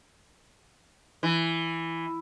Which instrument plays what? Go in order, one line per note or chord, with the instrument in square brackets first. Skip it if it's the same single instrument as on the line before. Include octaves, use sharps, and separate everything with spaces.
[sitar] E3